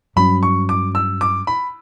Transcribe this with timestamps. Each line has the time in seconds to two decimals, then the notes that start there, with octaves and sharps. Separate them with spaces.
0.16 G2 F#3 C#4 B5
0.43 C#6
0.69 D6
0.95 E6
1.21 D6
1.47 B5